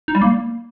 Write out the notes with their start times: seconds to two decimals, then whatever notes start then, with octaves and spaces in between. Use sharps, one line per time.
0.08 D#4
0.15 G3
0.22 A#3